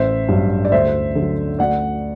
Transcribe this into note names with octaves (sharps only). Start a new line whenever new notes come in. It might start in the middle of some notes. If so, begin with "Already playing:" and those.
Already playing: A1 C5 E5
G2 F#3
D5
D2 C5 E5
D3 F#3
D2 D5 F#5